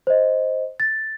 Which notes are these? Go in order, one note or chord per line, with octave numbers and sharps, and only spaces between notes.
C5 D#5
A6